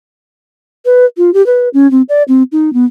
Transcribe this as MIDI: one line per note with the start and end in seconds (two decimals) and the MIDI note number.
0.85 1.06 71
1.17 1.33 65
1.34 1.44 67
1.46 1.69 71
1.74 1.90 61
1.91 2.02 60
2.09 2.23 74
2.28 2.43 60
2.52 2.73 63
2.73 2.85 59